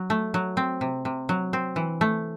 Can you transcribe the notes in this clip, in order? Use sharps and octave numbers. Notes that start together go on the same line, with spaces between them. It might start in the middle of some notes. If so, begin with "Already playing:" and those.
Already playing: F#3
A3
F#3
C4
C3
C3
F#3
C4
E3
A3